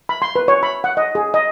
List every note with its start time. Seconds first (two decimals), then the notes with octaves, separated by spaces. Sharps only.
0.09 B5
0.22 C6
0.36 B4
0.48 C#5
0.63 B5
0.84 F#5
0.97 D#5
1.15 G#4
1.34 D#5